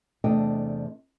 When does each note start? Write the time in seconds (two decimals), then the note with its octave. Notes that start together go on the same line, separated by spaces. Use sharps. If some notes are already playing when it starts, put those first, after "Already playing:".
0.24 E2 C3 A3 D4 D#5 G5